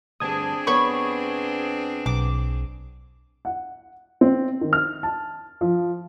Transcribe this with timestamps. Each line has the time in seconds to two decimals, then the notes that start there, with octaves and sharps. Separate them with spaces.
0.20 D2 G2 C4 D4 G#4 A5 D#6 G#6
0.67 F2 B3 C#5 B5 C#6
2.06 B1 D6
3.45 F#5
4.21 C4
4.61 D#3
4.73 F6
5.03 A5
5.61 F3